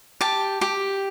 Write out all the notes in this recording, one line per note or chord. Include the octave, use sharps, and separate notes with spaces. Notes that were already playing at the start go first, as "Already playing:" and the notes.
G4 A5
G4